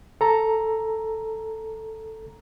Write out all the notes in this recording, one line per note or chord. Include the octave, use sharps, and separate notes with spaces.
A4 A#5